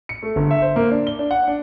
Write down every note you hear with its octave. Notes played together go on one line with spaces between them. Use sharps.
C#7
A3
G1
E5
C5
A#3
D4
G7
D4
F#5
D4